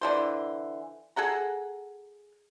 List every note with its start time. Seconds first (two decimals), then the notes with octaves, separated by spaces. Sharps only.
0.01 D3 E3 C5
1.16 G#4 A4 F#5 A#5